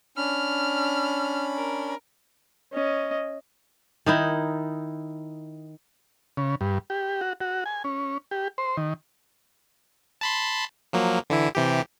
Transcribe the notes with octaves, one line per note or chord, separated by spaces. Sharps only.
C#4 D4 B5 F6
A#4
C#4 D#5
D#3 D#4 E4
C#3
G2
G4
F#4
F#4
G#5
C#4
G4
C5
D#3
A5 B5 C6
F3 F#3 A#3
D3 E3 E4
C3 E3 G4